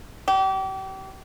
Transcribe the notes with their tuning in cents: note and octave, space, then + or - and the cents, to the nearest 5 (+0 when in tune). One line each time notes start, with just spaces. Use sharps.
G4 -35